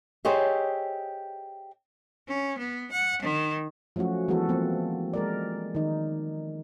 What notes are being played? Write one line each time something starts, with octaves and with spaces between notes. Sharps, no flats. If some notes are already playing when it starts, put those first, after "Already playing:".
G4 G#4 C5 C#5 D#5 E5
C#4
B3
F#5
D#3
F3 F#3 A3 C#4 F#4
E3 F3 G#3 B3 F#4 A4
F3 A#3 C4
G#3 A#4 D5
D#3 D#4